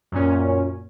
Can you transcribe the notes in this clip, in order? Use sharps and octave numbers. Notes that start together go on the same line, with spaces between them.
F#2 A#2 C#4